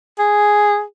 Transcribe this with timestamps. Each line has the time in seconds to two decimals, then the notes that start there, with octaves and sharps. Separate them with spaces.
0.19 G#4